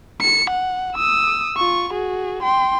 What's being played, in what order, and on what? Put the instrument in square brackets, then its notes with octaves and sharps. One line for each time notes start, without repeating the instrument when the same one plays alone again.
[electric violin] C#7
F#5
D#6 E6
F4 C#6
F#4 G#4
G5 C6